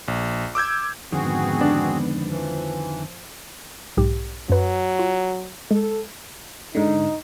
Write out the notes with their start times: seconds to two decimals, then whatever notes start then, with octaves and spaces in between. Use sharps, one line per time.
0.08 A#1
0.55 D6 E6 G6 G#6
1.12 F2 G#2 D3 D#3 B3 C4 F#4 G#4
1.61 D4
2.29 E3 F3
3.97 B1 G#2 G4
4.50 F#2 F#3 B4
4.99 F4
5.71 G#3 A4
6.75 G#2 D3 D#4